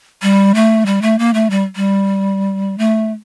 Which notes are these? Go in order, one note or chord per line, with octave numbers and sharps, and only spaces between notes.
G3
A3
G3
A3
A#3
A3
G3
G3
A3